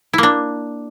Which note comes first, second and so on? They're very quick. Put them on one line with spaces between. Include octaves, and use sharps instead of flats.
E4 A#3 D4